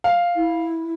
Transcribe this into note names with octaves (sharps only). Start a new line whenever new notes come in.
F5
E4